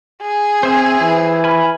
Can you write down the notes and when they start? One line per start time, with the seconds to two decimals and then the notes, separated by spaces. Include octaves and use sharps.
0.22 G#4
0.63 C4 C5 E5 G#5
1.01 E3
1.44 G#5 B5 F6